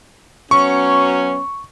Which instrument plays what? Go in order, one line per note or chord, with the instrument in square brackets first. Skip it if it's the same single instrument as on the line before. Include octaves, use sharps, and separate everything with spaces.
[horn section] F#3 B3 C#4 [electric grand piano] C#6